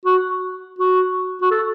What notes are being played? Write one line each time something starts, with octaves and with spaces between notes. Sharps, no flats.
F#4
F#4
F#4
A4